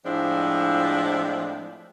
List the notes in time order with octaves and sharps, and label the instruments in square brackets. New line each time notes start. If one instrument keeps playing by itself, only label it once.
[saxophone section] A2 F3 G#3 C4 D4 E4